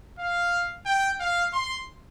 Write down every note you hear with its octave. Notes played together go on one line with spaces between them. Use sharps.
F5
G5
F5
C6